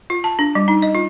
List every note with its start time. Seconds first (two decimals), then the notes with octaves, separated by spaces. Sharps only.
0.10 F4
0.24 A5
0.39 D4
0.55 G3
0.68 D#4
0.82 D#5
0.95 F4